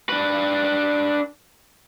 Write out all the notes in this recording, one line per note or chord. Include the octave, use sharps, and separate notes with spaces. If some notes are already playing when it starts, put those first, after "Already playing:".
D4 B4